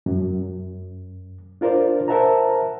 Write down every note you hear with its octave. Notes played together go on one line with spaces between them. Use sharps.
F#2
D4 F4 A#4 C5 D5
A#4 C5 E5 F#5 A5 A#5